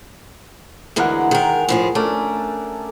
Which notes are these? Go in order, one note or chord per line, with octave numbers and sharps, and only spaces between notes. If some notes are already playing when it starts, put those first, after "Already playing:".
D2 E3 G#3 G#4 A#4 F#5
D#3 G#3 A#4
A2 F3 G#4
A3 C#4 D4 A#4